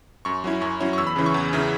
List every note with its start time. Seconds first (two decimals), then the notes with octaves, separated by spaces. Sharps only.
0.25 F#2 C#6
0.44 F#3 C#4 E4
0.61 F#2 C#6
0.80 F#3 C#4 E4
0.93 C#6
0.98 E2 E6
1.07 B5
1.16 C#3 E3 C#4 E4
1.26 C#6
1.34 E2
1.53 C#3 E3 C#4 E4